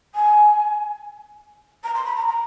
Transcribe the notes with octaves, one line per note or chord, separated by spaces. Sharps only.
G#5
A#5
C6
B5
A#5
A#5